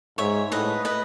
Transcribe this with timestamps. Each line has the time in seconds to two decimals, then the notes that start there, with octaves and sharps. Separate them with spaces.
0.18 G#2 C#5 E5
0.52 A2 B4 D#5
0.85 B4 D#5